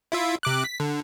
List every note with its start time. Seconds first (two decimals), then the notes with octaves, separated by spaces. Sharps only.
0.12 E4 F4 E5
0.43 C3 D6 F#6
0.64 B6
0.80 D3